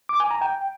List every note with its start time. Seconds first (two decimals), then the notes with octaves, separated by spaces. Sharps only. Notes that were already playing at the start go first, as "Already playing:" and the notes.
0.09 D6
0.20 G#5
0.31 A#5
0.41 G5